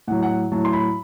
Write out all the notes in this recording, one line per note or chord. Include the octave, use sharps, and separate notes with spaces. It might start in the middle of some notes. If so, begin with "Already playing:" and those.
A2 F#3 F#5
F#5
A2 F#3 A5
C6
B5